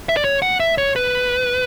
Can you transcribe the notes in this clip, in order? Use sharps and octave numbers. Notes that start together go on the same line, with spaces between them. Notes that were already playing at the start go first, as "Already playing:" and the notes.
E5
D5
C#5
F#5
E5
C#5
B4